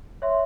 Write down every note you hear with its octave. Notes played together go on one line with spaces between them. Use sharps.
C#5 E5 C6